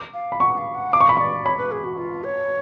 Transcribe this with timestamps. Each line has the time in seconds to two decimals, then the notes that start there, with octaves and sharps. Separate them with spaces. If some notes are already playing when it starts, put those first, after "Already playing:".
Already playing: D6
0.14 F5
0.32 B5
0.40 F#5 C#6
0.57 F5
0.75 F#5
0.92 F5 D6
1.01 C#6
1.09 B5
1.15 D5 F5 C#6
1.45 C#5 B5
1.58 B4
1.72 G#4
1.84 F#4
1.98 F4
2.24 C#5